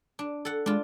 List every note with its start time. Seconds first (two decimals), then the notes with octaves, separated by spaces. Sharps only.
0.19 D4
0.45 A4 F#5
0.66 G#3 D4 F4